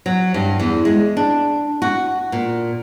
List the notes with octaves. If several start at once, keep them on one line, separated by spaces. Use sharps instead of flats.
F#3
G2
E2
G#3
D4
F#4
A#2